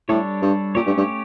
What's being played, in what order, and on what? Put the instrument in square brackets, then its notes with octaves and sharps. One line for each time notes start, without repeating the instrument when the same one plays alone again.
[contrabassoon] A2 [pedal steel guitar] G3 D4 A4 C#5
[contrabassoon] G2
[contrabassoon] A#2 [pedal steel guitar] A3 C#4 G4 C#5
[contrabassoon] G2
G2